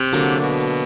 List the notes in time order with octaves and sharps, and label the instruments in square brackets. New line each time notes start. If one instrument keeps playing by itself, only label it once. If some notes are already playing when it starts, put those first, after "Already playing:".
Already playing: [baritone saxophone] C3
[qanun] D3 F#3 A#3 D4
[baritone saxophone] B2